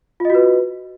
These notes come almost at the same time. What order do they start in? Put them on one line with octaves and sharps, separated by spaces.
F4 D#5 F#4 B4